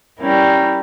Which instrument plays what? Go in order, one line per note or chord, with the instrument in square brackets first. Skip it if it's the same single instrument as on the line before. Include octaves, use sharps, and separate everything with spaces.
[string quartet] G3 C#4 E4 A#4